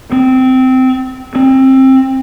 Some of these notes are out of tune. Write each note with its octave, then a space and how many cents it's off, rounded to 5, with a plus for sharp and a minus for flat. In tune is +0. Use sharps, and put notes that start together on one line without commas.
C4 -15
C4 +20